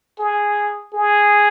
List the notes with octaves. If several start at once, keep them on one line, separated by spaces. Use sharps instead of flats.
G#4
G#4